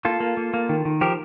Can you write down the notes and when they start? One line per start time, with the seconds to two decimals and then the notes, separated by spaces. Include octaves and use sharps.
0.05 A#3 F4 A4
0.20 A#3
0.37 A#3
0.54 A#3
0.69 D#3
0.85 D#3
1.01 F3 G4 A#4